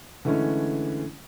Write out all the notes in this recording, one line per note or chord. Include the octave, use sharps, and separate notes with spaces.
D3 E3 G#3 A3 C#4